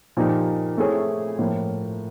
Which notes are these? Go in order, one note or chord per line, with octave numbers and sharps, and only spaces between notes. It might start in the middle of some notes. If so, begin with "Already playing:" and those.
A#2 F3 A#3 D#4 G4
A3 C4 E4 G#4 C#5
A2 F3 A#3